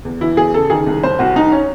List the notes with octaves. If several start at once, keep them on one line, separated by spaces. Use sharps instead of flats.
E2
E3 E4
E2 G#4
C#3 A4
D#3 G#4
C2
C2 C5
C2 F#4
C2 D#4
C#4